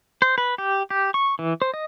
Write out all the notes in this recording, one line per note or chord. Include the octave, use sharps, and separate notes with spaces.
C5
B4
G4
G4
C#6
E3
C5
D#5